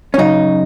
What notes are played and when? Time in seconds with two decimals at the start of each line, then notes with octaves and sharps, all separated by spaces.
0.14 C#4
0.18 F#2 C#3 F#3 D#4